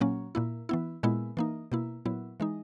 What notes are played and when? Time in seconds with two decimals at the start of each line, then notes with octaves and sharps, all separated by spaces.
0.01 A#2 F#3 A#3 C#4
0.35 A#2 A#3 E4
0.69 E3 B3 E4
1.03 A#2 G#3 B3 E4
1.37 E3 A#3 D#4
1.72 B2 A#3 E4
2.05 A#2 F#3 B3 E4
2.40 E3 G#3 D#4